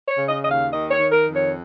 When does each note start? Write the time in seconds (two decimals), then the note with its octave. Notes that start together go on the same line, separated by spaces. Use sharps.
0.09 C#5
0.16 C#3
0.29 D#5
0.43 D#2 D#5
0.51 F5
0.71 D#3 D#5
0.91 C#5
0.98 D#3
1.12 A#4
1.26 F2
1.34 C#5